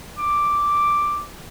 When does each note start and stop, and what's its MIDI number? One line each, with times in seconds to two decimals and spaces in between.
0.18 1.23 86